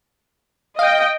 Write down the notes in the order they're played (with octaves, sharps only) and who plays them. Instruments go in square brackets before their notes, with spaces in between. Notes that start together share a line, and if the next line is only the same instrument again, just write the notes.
[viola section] D#5 G5 [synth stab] F5